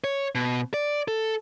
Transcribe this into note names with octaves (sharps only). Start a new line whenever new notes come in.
C#5
B2
D5
A4